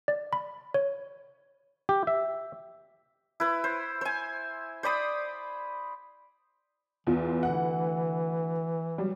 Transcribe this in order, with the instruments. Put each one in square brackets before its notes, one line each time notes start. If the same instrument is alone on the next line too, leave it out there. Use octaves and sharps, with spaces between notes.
[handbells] D5
B5
C#5
[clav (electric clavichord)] G4
E5
[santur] E4 B4
C5
C5 G#5
C5 D5 B5 D#6
[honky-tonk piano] E2 F4 [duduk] E3
[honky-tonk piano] D2 F#5
F#3 G3